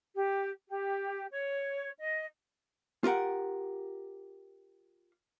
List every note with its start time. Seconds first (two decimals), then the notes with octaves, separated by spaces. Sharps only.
0.15 G4
0.68 G4
1.31 C#5
1.98 D#5
3.04 F4 G4 A#4 F#5